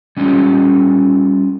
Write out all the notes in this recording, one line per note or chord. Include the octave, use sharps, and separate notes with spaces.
G3 C#4 D#4 F4 G4 A4